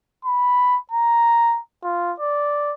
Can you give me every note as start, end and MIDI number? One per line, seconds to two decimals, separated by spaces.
0.25 0.78 83
0.92 1.59 82
1.83 2.13 65
2.20 2.73 74